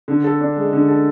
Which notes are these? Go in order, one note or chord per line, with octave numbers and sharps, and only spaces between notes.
D3
A4
D4
G#3
D3
A4